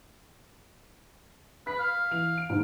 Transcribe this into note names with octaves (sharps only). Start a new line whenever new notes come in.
B4 B6
F5
E3 F7
D7
D#2 G#2